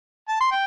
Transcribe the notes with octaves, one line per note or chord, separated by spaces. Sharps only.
A5
C6
G5